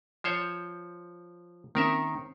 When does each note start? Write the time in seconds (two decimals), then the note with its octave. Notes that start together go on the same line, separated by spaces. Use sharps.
0.24 F3 C5 C#5
1.75 D#3 A#3 C4 C#4 A#4 E5